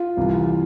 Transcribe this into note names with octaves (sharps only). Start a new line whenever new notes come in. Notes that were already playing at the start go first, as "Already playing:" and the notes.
Already playing: F4
C2 C3 E3